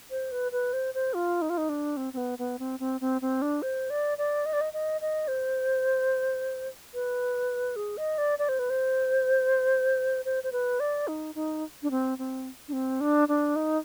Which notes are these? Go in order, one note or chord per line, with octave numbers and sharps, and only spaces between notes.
C5
B4
B4
C5
C5
F4
D#4
F4
D#4
D4
C4
C4
B3
B3
C4
C4
C4
C4
D4
C5
D5
D5
D#5
D5
D#5
D#5
D#5
C5
B4
G#4
D#5
D5
D5
C5
B4
C5
C5
C5
B4
D5
D#4
D#4
D4
C4
C4
D4
C4
D4
D4
D#4